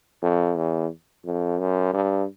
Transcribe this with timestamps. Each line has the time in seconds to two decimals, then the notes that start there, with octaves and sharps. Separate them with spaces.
0.23 F2
0.57 E2
1.25 F2
1.60 F#2
1.93 G2